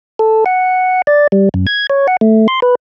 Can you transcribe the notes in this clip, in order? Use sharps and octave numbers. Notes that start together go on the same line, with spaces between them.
A4
F#5
D5
G3
F#2
G#6
C#5
F#5
A3
C6
B4